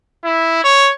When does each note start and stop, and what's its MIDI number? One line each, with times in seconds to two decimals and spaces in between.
0.25 0.64 64
0.64 0.91 73